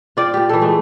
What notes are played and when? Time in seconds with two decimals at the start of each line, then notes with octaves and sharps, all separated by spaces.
0.17 F4 D5 G5
0.34 A#2 G4
0.49 E3 A4
0.61 G#3 A3